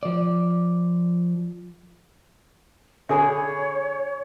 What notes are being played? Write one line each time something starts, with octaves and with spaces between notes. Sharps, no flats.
F3 D5
D3 G#4 C#5 E5 G#5 B5